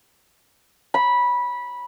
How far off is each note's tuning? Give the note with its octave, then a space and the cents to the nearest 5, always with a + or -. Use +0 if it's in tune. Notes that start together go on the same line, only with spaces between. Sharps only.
B5 -15